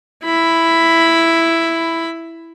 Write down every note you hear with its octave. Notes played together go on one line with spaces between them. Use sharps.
E4 B5